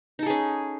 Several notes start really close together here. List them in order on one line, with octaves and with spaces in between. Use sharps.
D#4 A4 G#4 C#4